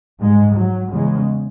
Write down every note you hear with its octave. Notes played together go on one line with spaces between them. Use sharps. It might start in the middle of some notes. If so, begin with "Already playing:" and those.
G#2 G#3
F#3
E2 C#3 G#3